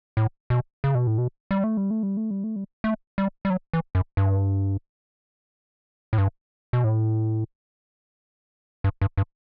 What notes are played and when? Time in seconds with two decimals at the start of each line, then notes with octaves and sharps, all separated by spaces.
0.17 A2
0.50 B2
0.84 C#3
0.95 B2
1.07 A2
1.18 B2
1.51 G3
1.64 A3
1.77 G3
1.91 A3
2.03 G3
2.17 A3
2.31 G3
2.44 A3
2.56 G3
2.84 A3
3.18 G3
3.45 G3
3.50 F#3
3.73 E3
3.95 F#2
4.17 G2
6.13 A2
6.18 G2
6.73 B2
6.84 A2
8.84 G2
9.01 G2
9.17 G2